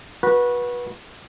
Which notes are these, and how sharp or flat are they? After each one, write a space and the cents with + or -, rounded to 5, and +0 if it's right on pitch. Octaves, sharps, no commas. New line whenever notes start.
F#4 -15 B4 -20